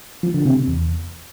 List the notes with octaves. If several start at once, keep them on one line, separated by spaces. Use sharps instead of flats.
F3
D3
C3
C3
E2